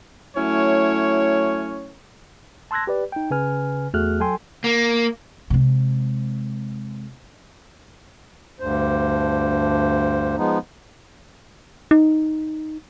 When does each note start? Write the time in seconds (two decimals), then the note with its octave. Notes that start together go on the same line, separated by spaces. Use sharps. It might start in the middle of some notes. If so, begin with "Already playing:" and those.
0.36 F#3 A3 C#4 E4 C#5
2.71 A5 C6 E6 F#6 G#6 A#6
2.87 G4 B4 D5
3.12 D#4 G5
3.31 C#3 B4 G#5 F6
3.94 E2 A3 F#4 G#4 F6 F#6
4.20 F#3 A4 G5 G#5 C6
4.64 A#3
5.50 C3 G#3
8.60 D2 G2 C5
10.37 F3 G#3 B3 D#4
11.91 D#4